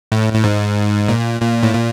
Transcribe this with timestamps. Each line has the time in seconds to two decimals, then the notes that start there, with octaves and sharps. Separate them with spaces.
0.12 A2
0.33 A2
0.44 G#2
1.08 A#2
1.41 A#2
1.63 A2
1.74 A#2